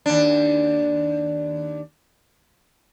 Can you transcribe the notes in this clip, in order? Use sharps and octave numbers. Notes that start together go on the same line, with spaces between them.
D#2 D4